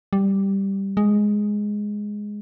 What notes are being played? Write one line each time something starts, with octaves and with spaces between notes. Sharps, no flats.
G3
G#3